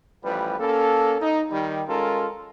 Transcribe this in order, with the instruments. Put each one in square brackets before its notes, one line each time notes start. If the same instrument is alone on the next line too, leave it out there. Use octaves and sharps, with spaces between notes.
[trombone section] A1 F3 G3 B4
A#3 C#4 A4
D#4
D#3 G3
G#3 C#4 F4 A4 A#4